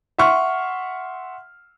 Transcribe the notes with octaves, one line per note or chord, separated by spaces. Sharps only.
E5 F#5 C6 C#6 F6